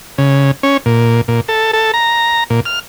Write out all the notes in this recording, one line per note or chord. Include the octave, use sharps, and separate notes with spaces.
C#3
C#4
A#2
A#2
A4
A4
A#5
A#2
F6